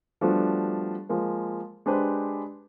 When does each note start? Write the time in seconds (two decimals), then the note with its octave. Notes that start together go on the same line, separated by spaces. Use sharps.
0.21 F3 G3 A3 B3 D4 F#4
1.09 F3 G#3 A#3
1.86 G#3 D4 G4 B4 C5